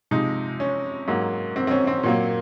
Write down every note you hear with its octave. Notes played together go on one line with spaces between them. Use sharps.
C3 F3 G#3 D#4
C#4
G#2 F#3 A#3
C4
C4
C#4
C4
A#2 F#3 A#3